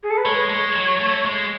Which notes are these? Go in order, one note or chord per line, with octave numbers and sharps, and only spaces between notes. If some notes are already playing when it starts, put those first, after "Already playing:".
G#4
A4
B4
G#3 C#5
G#3
F#3
A3
G#3